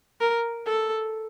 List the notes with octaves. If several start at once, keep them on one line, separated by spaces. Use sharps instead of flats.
A#4
A4